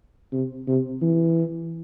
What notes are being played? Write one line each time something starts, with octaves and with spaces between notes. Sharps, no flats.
C3
C3
E3